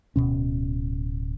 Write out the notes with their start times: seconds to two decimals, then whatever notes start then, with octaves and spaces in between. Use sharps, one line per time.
0.16 D1 C2 B2 C#4